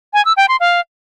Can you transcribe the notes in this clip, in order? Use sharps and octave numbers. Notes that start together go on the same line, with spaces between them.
G#5
E6
G5
C6
F5